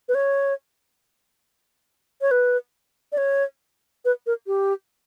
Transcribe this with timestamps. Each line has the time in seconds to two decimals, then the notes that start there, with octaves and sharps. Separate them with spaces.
0.09 B4
0.15 C#5
2.21 C#5
2.31 B4
3.12 D5
3.18 C#5
4.05 B4
4.27 A#4
4.47 G4